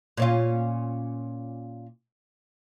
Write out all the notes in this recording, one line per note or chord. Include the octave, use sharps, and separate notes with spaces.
A#2 C#4 F4